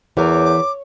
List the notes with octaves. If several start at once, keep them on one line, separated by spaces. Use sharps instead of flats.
E2 E3 A#4 C#5 D6